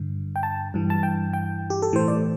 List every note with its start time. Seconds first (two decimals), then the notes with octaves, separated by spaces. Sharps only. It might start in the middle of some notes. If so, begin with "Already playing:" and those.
Already playing: G2 D3
0.36 G5
0.43 A5
0.74 G2 E3
0.90 A5
1.03 G5
1.33 G5
1.70 G4
1.82 A4
1.93 A2 E3 C5
2.08 D5